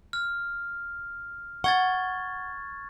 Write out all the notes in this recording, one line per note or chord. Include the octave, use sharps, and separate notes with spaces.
F6
F#5 C#6 G#6 A6